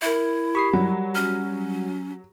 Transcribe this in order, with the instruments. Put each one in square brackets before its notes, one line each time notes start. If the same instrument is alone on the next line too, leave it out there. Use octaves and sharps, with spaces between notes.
[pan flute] E4 [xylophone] A#4 E5
[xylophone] G4 B5 B6 [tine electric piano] C#6 D#6 C7
[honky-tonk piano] F#3 [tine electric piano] G3 F#5
[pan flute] C#4 [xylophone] F6